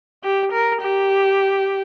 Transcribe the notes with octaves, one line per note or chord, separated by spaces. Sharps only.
G4
A#4
G4